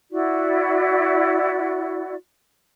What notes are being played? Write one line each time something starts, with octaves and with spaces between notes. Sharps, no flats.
E4 F#4 D5